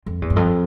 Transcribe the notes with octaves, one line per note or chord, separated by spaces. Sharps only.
F2
E2
G2
F2